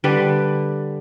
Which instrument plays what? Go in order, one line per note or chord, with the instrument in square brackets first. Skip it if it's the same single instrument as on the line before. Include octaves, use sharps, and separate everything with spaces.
[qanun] D3 G3 B4 D6